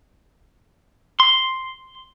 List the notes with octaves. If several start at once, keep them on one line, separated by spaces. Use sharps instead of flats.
C6